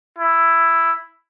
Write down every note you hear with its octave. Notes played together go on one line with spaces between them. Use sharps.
E4